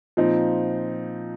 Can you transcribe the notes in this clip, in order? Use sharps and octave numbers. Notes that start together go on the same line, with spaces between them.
A#2 F3 C4 D#4